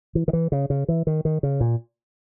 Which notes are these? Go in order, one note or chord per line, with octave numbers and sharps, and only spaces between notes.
E3
D#3
E3
C#3
C#3
E3
D#3
D#3
C#3
A#2